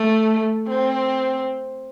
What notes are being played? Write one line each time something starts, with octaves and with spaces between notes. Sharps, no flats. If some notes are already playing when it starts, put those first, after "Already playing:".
Already playing: A3
C4